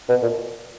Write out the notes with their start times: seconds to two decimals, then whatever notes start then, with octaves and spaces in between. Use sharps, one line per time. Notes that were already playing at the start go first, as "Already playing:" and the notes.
0.09 B2
0.23 A#2